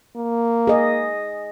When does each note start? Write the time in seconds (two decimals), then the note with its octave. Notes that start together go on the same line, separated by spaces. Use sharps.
0.16 A#3
0.67 G#4 D#5